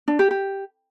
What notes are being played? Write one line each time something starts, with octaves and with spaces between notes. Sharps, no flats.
D4
G4
G4